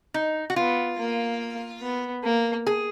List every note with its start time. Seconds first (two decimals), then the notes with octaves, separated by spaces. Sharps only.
0.14 D#4
0.50 F#4
0.56 B3 F4
0.98 A#3
1.82 B3
2.24 A#3
2.67 G#4